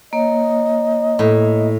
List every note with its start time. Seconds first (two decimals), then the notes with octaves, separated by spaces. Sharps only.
0.13 A#3 C#5 D#5
1.19 A2